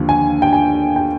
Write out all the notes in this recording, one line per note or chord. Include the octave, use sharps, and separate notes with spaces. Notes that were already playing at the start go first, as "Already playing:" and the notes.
Already playing: D#2 D3 F3
G#5
G5
G#5
G5